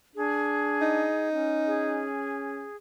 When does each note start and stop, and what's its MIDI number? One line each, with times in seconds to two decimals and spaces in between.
0.16 1.08 62
0.16 1.29 68
0.82 2.07 63
1.28 2.67 61
1.66 2.77 68